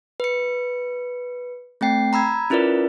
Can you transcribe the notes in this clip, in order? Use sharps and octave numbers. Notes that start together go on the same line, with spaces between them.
B4 C#7
A3 C4 G5 C7
A#5 B5 E6 G#6
C#4 E4 F4 A#4 B4 D5